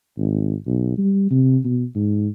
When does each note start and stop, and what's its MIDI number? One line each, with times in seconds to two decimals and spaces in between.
0.18 0.55 32
0.67 0.95 35
0.98 1.30 55
1.31 1.59 48
1.65 1.85 47
1.95 2.28 44